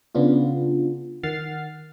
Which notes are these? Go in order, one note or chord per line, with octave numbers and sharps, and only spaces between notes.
C#3 B3 D4 F4
D#3 F#5 F6 A6 C7